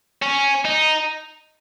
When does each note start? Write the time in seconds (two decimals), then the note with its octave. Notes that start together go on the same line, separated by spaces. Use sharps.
0.23 C#4
0.65 D#4